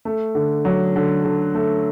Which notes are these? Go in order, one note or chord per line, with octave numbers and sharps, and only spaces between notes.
A3
D3
F#3
D3
D3
A3